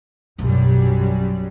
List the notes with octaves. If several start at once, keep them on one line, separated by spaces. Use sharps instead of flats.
A#1 F#2 B2 F#3 G3